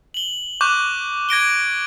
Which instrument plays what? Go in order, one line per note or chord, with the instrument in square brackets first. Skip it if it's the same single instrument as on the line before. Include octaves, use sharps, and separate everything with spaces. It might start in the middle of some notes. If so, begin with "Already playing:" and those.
[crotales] F#7 G7
C#6 D6 F#6 G6
G#6 A#6 D7 G7